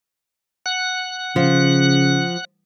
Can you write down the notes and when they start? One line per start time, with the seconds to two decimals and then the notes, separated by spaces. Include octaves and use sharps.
0.66 F#5 F#6
1.36 C#3 F3